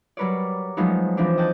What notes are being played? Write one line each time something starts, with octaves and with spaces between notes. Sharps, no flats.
F#3 G3 A#4 B4 C#5 D5
F3 F#3 G#3 A3 B3 D#4
E3 F3 C4 D4
D#5 G5 A5 F#6 G6